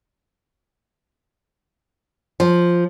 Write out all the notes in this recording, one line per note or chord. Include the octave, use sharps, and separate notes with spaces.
F3